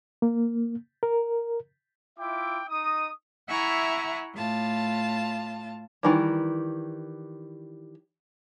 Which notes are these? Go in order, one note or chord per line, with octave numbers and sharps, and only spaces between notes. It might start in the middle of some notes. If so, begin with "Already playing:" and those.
A#3
A#4
E4 F4 E5 G5 D6
D#4 D#5 D#6
E4 E5 F#5 G#5 A#5 C#6
A2 F4 A5
D#3 E3 G3